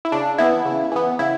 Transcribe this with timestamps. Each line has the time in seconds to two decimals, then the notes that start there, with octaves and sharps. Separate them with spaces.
0.05 E4
0.12 C#3 D4
0.38 E3 B3 E4
0.65 C#3
0.92 E3 B3
1.19 C#3 E4